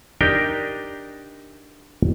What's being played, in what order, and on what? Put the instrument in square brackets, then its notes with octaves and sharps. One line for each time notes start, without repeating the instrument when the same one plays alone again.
[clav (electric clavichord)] D4 D#4 G4 A#4 G5